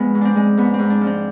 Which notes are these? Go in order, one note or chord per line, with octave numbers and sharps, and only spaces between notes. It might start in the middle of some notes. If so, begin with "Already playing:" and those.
Already playing: F2 G#3 B3
G#2
C4 D4
G#3
G#2 B3
C4
G#2
D4
F3
C4